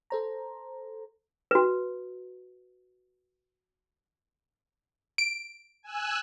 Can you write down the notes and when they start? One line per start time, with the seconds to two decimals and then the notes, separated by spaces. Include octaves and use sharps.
0.10 A4 C5 A#5
1.51 F#4 B4
5.18 D7
5.83 G#5 E6 F#6